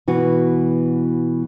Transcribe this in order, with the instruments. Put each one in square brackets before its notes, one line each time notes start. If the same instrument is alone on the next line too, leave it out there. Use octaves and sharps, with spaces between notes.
[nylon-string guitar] B2 E3 F#4